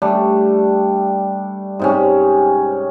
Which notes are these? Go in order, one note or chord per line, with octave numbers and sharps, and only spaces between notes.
G3 A3 D4
G#2 C3 C#4